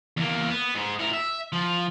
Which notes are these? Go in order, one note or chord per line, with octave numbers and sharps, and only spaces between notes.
E2 A#3
B3
G#2 G#3
A2 A#4
E5
F3